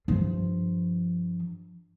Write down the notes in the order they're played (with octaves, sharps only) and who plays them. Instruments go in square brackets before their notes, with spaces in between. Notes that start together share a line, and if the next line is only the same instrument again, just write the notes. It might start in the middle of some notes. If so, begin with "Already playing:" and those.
[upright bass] G2 F3